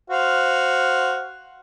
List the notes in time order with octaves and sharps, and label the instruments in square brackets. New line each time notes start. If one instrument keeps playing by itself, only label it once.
[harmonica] F#4 C5 F5